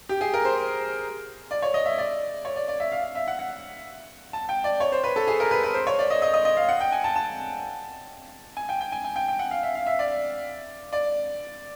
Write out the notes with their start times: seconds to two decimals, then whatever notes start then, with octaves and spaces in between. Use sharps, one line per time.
0.09 G4
0.21 G#4
0.34 A#4
0.45 C5
1.51 D5
1.62 C#5
1.74 D#5
1.86 E5
1.98 D5
2.45 C#5
2.56 D5
2.68 D5
2.80 E5
2.92 F5
3.04 F5
3.15 E5
3.28 F#5
3.39 F#5
4.33 A5
4.49 G5
4.64 D5
4.80 C#5
4.92 C5
5.04 B4
5.16 A4
5.27 G#4
5.40 A#4
5.51 B4
5.63 B4
5.74 C5
5.87 C#5
5.99 D5
6.11 D#5
6.22 D#5
6.34 D#5
6.45 D#5
6.57 F5
6.69 F#5
6.81 G5
6.92 G#5
7.04 A5
7.16 A5
8.57 G#5
8.69 G5
8.81 G5
8.92 G#5
9.04 G#5
9.16 G5
9.28 G5
9.39 F#5
9.51 F5
9.63 E5
9.75 F5
9.86 E5
9.99 D5
10.93 D5